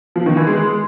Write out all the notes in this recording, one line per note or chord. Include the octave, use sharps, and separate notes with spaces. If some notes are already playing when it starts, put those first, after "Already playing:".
F3
D#3
E3
G#3